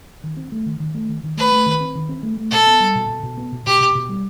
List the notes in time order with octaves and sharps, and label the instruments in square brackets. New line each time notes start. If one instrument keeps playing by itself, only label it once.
[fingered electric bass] D#3
C4
A3
D#3
D#3
A3
D#3
D#3
[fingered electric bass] A3 [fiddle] B4
[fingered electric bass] A3
D#3
C4
D#3
C4
A3
A3
[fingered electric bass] B2 [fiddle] A4
[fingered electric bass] B3
G3
B2
B2
B2
B3
B2
[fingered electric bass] B2 [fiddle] G4
[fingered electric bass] B2
B2
G3